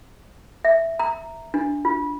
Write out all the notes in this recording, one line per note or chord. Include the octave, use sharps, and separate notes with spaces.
E5
A#5
D4
F4